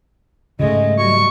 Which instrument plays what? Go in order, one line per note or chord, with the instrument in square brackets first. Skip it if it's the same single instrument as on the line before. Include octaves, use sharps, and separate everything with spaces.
[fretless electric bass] G#2 C#3 [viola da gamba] G#3 A3 [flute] D#5
[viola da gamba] F#3 G3 [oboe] C#6